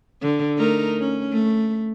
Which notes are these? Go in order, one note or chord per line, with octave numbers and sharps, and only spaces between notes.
D3
A3 D#4 A#4
C#4
A3